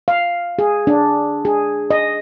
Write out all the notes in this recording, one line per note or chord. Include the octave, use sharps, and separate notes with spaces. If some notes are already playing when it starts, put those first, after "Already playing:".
F5
G#4
D4
G#4
D#5